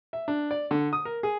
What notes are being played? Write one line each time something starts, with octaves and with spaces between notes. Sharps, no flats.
E5
D4
D5
D3
D#6
A#4
G#4